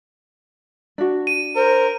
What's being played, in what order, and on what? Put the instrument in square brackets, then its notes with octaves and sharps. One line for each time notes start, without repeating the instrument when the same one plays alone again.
[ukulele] D4 F#4
[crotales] D#7
[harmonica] A#4 [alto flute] C5